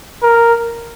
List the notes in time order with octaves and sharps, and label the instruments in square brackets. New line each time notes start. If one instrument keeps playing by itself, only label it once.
[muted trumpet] A#4